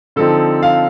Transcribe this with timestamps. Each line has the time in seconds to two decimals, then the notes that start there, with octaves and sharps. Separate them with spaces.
0.16 D3 F3 C4 D#4 A4
0.62 F5